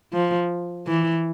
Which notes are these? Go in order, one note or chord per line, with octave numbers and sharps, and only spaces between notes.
F3
E3